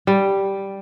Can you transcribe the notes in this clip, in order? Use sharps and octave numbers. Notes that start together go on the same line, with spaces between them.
G3